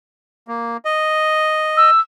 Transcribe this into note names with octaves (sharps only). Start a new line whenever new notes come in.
A#3
D#5
E6